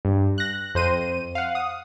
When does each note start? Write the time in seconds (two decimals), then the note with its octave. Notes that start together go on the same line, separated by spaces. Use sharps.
0.05 G2
0.38 F#6 A#6
0.75 F2 C5 D#7
1.35 F5 F#5
1.55 D#6